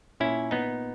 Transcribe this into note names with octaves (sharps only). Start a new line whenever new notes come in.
A#2 C#4 E4
B3 D#4